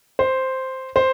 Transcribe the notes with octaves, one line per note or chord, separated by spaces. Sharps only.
C5
C5